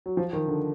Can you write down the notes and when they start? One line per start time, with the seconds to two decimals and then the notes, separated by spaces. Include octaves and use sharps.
0.06 F#3
0.17 F3
0.33 D#3
0.48 D3